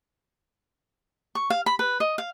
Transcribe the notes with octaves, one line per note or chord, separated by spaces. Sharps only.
C#6
F5
B5
B4
D#5
F5